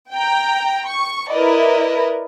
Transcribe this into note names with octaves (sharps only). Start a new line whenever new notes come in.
G5 A#5
C#6
E4 A#4 B4 D5 D#5